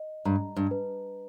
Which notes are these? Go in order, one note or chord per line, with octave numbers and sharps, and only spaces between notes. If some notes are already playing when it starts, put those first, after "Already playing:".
Already playing: D#5
G2 A#5
G2
B4